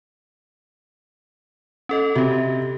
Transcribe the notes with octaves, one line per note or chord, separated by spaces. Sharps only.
C#4 A4 D#5
C3 F#4 G4